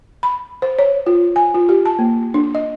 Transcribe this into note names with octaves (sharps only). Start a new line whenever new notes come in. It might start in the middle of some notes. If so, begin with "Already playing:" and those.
B5
C5
C#5
F4
G#5
F4
G4
A5
A#3
D4
D#5